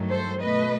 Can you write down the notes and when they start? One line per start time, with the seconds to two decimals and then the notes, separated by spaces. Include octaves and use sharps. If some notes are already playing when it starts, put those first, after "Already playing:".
Already playing: G2 D#3 F#3 A3
0.10 A4 C5
0.41 B2 A3 B4 D#5